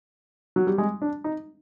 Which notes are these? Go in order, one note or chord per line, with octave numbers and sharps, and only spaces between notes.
F#3
G3
G#3
D4
D#4